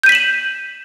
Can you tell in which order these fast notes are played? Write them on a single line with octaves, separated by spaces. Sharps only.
G6 D#7 B6 F#7 E7